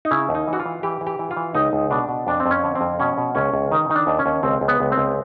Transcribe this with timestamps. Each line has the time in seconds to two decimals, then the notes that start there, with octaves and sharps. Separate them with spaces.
0.05 D#4
0.11 C#3 E4
0.29 D#2
0.35 D#4
0.48 E3
0.53 F#4
0.60 F4
0.66 E3
0.83 E3 G4
1.01 E3
1.07 G4
1.19 E3
1.31 F4
1.37 E3
1.55 C#2 D#4
1.73 C#2
1.91 B2 D4
2.09 B2
2.27 F2 D4
2.40 C4
2.46 F2
2.51 C#4
2.64 D3
2.75 C4
2.81 F2
3.00 B2 C#4
3.18 B2
3.35 C#2 C#4
3.54 C#2
3.71 D#3 D#4
3.90 D#3 D#4
3.96 D4
4.07 D#2
4.19 C#4
4.26 D#2
4.43 C#2 C4
4.61 C#2
4.68 B3
4.80 C#2
4.92 C4
4.98 C#2